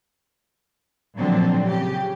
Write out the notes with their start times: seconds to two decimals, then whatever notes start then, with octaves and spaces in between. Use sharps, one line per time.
1.18 A#2 D3 F3 F#3 C4 D4
1.65 C#3 G4